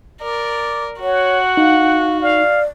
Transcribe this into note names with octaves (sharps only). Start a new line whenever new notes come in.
A#4 D5
F#4 C#5 F#5
D#4 F5
D5 F5